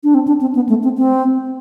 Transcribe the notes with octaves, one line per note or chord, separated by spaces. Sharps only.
D4
C4
D4
C4
B3
A3
C4
C4